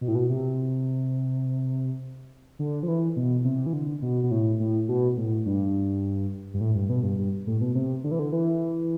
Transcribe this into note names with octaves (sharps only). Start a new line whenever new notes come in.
B2
A2
B2
C3
D3
F3
E3
B2
C3
E3
D3
B2
B2
A2
A2
B2
A2
G2
G2
A2
G2
B2
G2
G2
A2
B2
C3
D3
E3
D3
E3